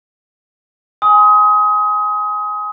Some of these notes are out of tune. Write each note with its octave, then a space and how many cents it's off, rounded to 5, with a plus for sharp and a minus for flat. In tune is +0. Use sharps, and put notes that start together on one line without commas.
G#5 +0 C6 -25 D#6 +25